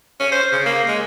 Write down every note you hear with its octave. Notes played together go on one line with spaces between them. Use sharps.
C#4
C5
C#3
A#3
G#3